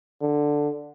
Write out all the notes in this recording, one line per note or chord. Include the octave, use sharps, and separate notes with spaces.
D3